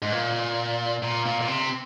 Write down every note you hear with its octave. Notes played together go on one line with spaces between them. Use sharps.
G#2
A#2
A#2
A#2
A#2
C3